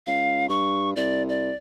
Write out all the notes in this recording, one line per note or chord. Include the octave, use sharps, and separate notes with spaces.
C#2 F5
G2 C#6
C2 D5
D5